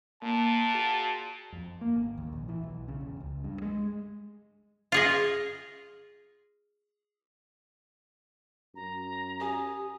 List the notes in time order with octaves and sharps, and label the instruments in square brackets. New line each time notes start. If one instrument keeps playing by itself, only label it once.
[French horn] A#2 [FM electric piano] A#3 [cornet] A5
[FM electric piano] F#4 G#4
[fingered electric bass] F2
A#3
G#1
D#2
A#1
E3
B1
C#3
E1
C#2
G2
G#3
[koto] F4 G#4 D#5
[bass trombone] F#2 [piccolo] A#5
[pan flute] G4 [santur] G#5 D#6